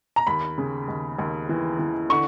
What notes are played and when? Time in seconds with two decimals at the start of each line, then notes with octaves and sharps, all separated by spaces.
0.16 A#5
0.27 D#2 B5
0.58 C#3
0.88 D#2
1.19 D#2
1.49 E3
1.79 E3
2.10 D3 C#6